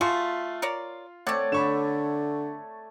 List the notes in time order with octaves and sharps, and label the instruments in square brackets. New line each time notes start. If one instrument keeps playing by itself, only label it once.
[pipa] A3 F#4 G#4 [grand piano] F4 F5 C6
[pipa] A#4 C#5 D5
[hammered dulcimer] A3 C#5 D5 [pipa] C4 F#5
[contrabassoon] D3 [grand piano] B5 C#6 E7